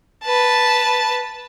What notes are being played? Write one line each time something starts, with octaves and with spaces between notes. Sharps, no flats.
B4 A5